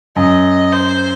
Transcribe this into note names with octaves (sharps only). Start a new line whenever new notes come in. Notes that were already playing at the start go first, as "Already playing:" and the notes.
F#2 D#5
C5